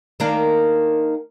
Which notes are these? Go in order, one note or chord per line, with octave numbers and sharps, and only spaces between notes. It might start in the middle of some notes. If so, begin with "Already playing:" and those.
D#3 A#3 D4